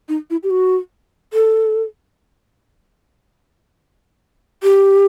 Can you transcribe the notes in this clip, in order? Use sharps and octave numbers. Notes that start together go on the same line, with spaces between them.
D#4
E4
G4
F#4
A4
G4